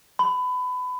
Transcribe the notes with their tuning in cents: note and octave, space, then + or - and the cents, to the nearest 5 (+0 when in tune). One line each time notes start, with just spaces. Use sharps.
B5 +25